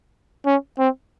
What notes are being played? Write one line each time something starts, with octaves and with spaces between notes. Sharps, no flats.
C#4
C4